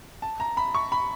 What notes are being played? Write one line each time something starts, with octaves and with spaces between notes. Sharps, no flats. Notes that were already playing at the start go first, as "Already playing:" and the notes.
A5
A#5
B5
C#6
B5